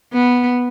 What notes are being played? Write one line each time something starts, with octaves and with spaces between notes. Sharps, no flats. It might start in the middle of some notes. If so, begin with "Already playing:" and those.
B3